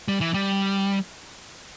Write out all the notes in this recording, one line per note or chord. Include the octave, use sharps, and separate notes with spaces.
G3
E3
G3